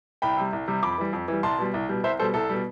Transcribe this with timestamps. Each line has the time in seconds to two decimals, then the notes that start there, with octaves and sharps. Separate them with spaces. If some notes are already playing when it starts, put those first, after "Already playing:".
0.22 C2 G5 B5
0.37 C3 G3
0.53 C2
0.68 C3 G3
0.83 F2 B5 D6
0.98 E3 G3
1.13 F2
1.28 E3 G3
1.43 C2 A5 C6
1.58 B2 G3
1.74 C2
1.89 B2 G3
2.04 C2 C5 E5
2.19 B2 G3 A4 C5
2.34 C2 A4
2.50 B2 G3